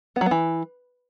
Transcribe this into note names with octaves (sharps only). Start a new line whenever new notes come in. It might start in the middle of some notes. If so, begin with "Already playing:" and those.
B3
F#3
B3
E3